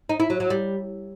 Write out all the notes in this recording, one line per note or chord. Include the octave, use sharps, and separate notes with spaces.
D#4
E4
F#3
F#3
G3